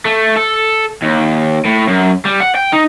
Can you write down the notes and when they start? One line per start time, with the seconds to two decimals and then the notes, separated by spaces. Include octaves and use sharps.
0.05 A3
0.37 A4
1.02 D#2
1.65 A2
1.88 F#2
2.25 G3
2.41 F#5
2.56 G5
2.73 D#4